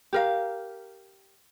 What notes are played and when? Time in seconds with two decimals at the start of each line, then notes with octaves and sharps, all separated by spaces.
0.13 G4 A#4 F5